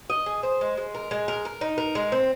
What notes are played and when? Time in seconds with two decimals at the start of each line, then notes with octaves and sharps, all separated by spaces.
0.10 D#5
0.26 G#4
0.43 C5
0.61 G#3
0.77 G#3
0.95 A#4
1.11 G#3
1.28 A#4
1.45 A#4
1.61 D#4
1.78 A#4
1.95 G#3
2.12 C4